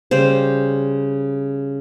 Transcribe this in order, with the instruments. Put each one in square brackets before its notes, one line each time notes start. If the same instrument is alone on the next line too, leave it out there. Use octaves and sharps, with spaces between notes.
[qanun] C#3 G3 C5